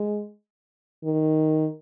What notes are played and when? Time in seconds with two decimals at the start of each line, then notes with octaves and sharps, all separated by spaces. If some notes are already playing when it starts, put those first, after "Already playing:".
Already playing: G#3
1.04 D#3